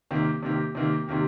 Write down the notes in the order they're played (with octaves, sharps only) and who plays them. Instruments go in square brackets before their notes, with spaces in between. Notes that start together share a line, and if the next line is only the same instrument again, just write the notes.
[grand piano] C3 D#3 A#3 G4
C3 D#3 A#3 G4
C3 D#3 A#3 G4
C3 D#3 A#3 G4